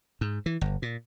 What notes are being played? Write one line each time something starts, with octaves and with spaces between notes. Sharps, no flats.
G#2
E3
G1
A#2